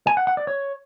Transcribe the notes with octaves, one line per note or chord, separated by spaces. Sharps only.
G#5
F#5
F#5
D5
C#5